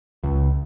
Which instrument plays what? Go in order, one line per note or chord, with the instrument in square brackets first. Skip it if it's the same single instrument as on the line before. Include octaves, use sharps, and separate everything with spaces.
[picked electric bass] C#2